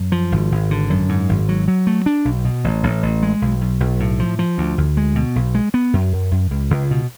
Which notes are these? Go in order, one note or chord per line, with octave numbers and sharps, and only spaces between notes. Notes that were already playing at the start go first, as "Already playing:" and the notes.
Already playing: F#2
F3
G#1
G#1
D3
F#2
G#2
G#1
F#3
F#3
A3
D4
B1
B2
A1
A1
A1
G#3
B1
B1
B1
A2
F3
F3
D2
D2
G#3
B2
B1
G#3
B3
F#2
F#2
F#2
C#2
C#2
B2